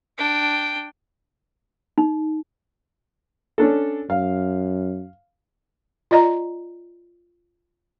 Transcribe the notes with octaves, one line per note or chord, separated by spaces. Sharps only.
D4 G5
D#4
C#4 D4 A4
F#2 F5
F4 D5 D#5 A#5